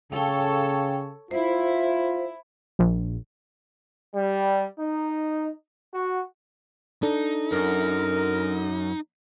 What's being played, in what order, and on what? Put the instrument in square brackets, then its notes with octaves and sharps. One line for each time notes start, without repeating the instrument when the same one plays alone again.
[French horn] C#3 [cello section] A4 C#5 [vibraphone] F5 G5
[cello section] E4 [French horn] F4 [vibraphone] C5
[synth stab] A#1
[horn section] G3
D#4
F#4
[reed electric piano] D4 A4 [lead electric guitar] D#4
[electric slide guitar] F#2 [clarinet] A#4